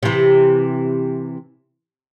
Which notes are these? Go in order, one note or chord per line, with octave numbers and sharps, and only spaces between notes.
C3 E3